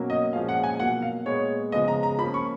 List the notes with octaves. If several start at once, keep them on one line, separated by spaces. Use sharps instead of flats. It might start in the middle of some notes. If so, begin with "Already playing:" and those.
Already playing: B2 F#3 A#3 C#4
D#5
A#2 F3 G#3 C#4 F5
F#5
G#5
B2 F#3 A#3 F#5
F5
A#2 G#3 B3 C#5
C#3 F3 G#3 B3 D#5
A#5
A#5
F3 A#3 C#4 B5
C#6